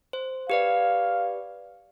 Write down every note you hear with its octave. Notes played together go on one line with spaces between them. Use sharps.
C5
G4 B4 D5 F5